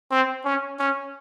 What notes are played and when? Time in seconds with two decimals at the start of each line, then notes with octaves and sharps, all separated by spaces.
0.11 C4
0.45 C#4
0.79 C#4